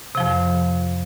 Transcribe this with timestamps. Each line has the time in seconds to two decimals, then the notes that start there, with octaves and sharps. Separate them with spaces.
0.15 C3
0.17 F3
0.20 F2